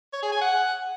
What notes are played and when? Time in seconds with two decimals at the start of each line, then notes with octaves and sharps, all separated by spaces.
0.13 C#5
0.23 G#4
0.32 G#5
0.41 F#5